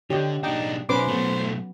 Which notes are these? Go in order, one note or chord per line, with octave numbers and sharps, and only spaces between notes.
D3 G4 C#5 D#5
B1 D4 D#4 G5
B1 F#3 C#4 B4 C5 D6
B1 F#3 A3 B3